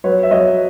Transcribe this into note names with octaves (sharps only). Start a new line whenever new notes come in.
F#3 B4 C#5
E5
F#3 C#5 D#5